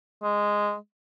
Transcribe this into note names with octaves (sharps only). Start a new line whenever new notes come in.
G#3